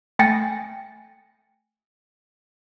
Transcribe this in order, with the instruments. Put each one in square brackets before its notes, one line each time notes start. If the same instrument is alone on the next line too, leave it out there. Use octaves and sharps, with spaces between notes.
[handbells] A3 G5 G#5 A6 A#6 C#7